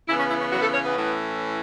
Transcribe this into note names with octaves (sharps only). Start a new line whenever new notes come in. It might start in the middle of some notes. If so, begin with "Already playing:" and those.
C#3 E3 B3 E4
C#4
E4
C#4
F#3 F#4
B4
A3 A4
C#4 C#5
B3 B4
A2 E3 C#4